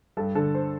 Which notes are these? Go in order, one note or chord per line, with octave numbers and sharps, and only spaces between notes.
G2 A4
D3 A4
C5